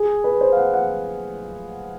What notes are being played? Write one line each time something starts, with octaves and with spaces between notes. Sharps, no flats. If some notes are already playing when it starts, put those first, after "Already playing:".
Already playing: G#4
B4
C5
F5
F#5
F#5